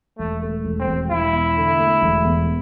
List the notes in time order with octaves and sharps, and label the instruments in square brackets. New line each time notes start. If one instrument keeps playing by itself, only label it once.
[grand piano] E1 [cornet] A3
[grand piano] A3
E1
[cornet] C4
[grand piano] E1
[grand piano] E1 [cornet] E4
[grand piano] E2
D3
A3
E1
E2